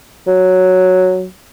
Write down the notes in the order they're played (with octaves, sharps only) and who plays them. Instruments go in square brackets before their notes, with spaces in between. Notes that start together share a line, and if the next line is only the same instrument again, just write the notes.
[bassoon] F#3